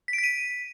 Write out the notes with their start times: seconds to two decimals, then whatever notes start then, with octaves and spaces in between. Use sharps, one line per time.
0.08 B6
0.13 D7
0.18 B6
0.24 D#7